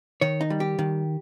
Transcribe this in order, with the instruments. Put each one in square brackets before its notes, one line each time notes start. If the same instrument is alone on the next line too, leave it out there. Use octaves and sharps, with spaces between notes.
[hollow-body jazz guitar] D#3 C#5
D#4
G3
G4
D#3